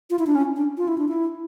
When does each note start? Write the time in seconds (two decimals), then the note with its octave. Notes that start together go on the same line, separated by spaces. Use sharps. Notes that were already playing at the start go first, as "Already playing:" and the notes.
0.10 F4
0.19 E4
0.27 D4
0.35 C#4
0.56 D4
0.78 F4
0.88 E4
0.98 D4
1.08 E4